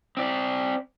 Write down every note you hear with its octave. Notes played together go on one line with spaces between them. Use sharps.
C4 D5